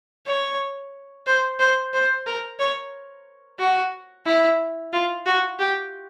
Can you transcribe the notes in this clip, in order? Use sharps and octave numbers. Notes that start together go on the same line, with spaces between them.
C#5
C5
C5
C5
A#4
C#5
F#4
E4
F4
F#4
G4